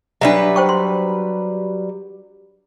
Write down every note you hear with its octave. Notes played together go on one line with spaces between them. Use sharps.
F#3 G3 D4 B4 E5 A#5
C5 G5 C#6
C6